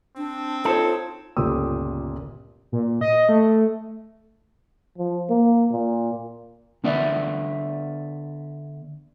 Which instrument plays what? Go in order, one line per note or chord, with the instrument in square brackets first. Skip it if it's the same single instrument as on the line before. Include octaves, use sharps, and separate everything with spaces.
[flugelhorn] C4 [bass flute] D4
[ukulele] D#4 C5 C#5 [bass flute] F4 [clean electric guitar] A4
[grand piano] G1 C#2 A#2 G4 D#6 E6
[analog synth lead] A#2
D#5
A3
[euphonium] F3
A#3
A#2
[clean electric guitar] D3 B3 D5 E5